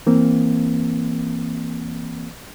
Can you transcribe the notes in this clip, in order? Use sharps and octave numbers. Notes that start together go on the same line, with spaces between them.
E3 A#3 C4